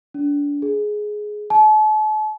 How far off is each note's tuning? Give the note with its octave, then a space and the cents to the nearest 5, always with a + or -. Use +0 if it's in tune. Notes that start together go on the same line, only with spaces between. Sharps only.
D4 -30
G#4 +10
A5 -40